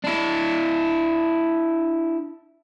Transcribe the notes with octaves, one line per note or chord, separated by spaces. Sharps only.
D4 E4